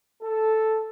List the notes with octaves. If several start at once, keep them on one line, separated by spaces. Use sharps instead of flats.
A4